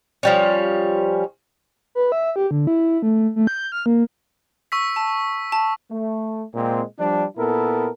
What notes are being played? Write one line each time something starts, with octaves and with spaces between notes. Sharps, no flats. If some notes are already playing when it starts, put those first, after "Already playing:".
F3 G3 C#4
B4
E5
G4
D3
E4
A3
A3
G6
F6
A#3
C#6 E6 B6
A5
A5
A3
A#2 G#3 C4
F3 G3 D4
A#2 B3 E4 A4 A#4